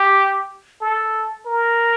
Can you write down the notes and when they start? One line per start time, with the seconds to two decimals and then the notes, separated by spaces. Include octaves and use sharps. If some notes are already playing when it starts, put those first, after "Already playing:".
Already playing: G4
0.81 A4
1.46 A#4